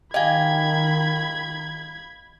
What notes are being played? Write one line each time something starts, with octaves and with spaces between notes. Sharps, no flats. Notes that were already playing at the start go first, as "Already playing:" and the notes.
D#3 G4 D#5 F5 G#5 B5 G#6